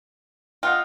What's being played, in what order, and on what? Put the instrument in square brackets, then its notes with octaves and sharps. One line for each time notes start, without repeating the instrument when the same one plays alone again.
[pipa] F4 [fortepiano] D#5 F#5 G5